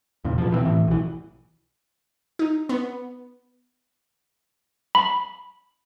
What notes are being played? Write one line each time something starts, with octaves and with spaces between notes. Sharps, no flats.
E2 A#2 C#3
B2 F3
B2 E3 A3 C4
A2 E3
B1 E3
D#4
B3
B5